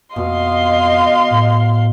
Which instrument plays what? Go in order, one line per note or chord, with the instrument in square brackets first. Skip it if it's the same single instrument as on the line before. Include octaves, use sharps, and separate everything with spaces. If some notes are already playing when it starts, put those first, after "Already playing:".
[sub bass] F2 [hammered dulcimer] B2 [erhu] D#5 [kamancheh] F5 C6
[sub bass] A2